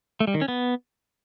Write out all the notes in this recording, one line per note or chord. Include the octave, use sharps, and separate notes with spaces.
A3
G3
D#3
C#4
B3